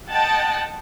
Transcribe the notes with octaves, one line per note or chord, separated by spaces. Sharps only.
D#5 F#5 G5 A5